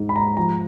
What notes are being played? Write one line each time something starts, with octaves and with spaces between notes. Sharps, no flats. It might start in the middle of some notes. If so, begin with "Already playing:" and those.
Already playing: G#2
B5
A#5
F3 A#5